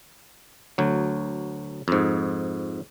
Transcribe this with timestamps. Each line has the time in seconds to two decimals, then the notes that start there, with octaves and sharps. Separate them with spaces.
0.78 D2 F#3
1.88 F2 G#2